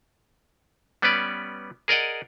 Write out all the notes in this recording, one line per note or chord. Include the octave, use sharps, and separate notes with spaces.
G3 B3 C#4 B4 D5
G#4 A#4 D5 D#5 F#5